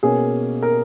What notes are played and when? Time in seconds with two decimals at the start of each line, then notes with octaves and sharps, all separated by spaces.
0.03 B2 A#3 C#4 G#4
0.63 A#4